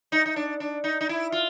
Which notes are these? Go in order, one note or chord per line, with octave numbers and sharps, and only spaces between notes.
D#4
D#4
D4
D4
D#4
D#4
E4
F4